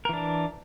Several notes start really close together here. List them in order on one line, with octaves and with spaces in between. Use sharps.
A#4 E3 D4